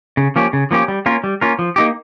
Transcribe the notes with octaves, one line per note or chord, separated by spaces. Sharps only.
C#3
F3 A#3 C#4 G4
C#3
F3 A#3 C#4 G4
G3
A#3 C#4 F4 A#4
G3
A#3 C#4 F4 A#4
F3
A#3 D#4 G4